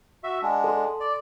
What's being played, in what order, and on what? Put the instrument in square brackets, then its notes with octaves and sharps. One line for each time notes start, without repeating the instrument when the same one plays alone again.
[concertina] F#4 E5
[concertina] G#3 D4 [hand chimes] F#5
[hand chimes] A4 C6
[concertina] D5